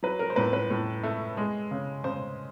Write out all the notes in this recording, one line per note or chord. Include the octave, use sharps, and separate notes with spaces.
F#3 B4
A#4
C5
A2 B4
B4
A2
A3
G#3
C#3
C#3 C5